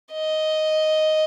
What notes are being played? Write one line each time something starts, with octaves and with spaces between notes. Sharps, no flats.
D#5